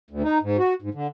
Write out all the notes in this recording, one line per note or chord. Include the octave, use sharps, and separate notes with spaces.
D2
D#4
G#2
F#4
G#2
D3